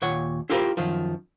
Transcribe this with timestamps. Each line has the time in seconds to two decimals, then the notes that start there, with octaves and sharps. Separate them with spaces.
0.02 D#2 A#2 C#5 F#5
0.50 E4 F4 G4 A#4 C5 B5
0.77 F#2 D#3 F3